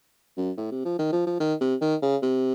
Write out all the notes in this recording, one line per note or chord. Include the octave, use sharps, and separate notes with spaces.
F#2
A2
C3
F3
D#3
F3
F3
D#3
C3
D#3
C#3
C3